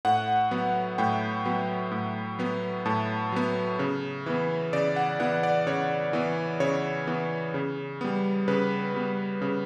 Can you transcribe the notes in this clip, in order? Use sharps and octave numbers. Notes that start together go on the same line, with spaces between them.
A2 F#5
F#3 B3
A2 G5
F#3 B3
A2
F#3 B3
A2 A5
F#3 B3
C#3
E3 B3
C#3 D5
F#5
E3 B3 F#5
D5
C#3 C#5
E3 B3
C#3 C#5
E3 B3
C#3
G3 B3
C#3 B4
G3 B3
C#3